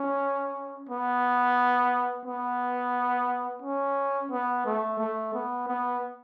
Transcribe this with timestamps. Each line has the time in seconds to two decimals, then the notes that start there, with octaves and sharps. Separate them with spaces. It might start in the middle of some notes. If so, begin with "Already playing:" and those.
Already playing: C#4
0.89 B3
2.25 B3
3.62 C#4
4.30 B3
4.65 A3
4.99 A3
5.34 B3
5.68 B3